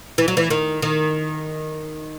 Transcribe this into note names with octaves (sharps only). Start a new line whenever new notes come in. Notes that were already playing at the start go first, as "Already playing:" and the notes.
E3
F#3
E3
D#3
D#3